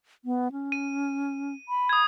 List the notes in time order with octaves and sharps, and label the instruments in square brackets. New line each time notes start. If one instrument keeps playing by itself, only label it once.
[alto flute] B3
C#4
[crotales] D#7
[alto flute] B5
[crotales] D#6 G#6